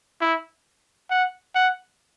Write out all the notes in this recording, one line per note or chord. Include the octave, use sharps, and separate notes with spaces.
E4
F#5
F#5